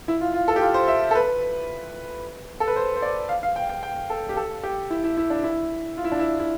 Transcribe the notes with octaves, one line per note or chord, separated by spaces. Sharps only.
E4
F4
F4
A4
G4
F4
C5
E5
A4
B4
A4
B4
C5
C5
D5
F5
F5
G5
G5
G5
A4
G4
A4
G4
E4
E4
E4
D4
E4
F4
E4
D4
E4
E4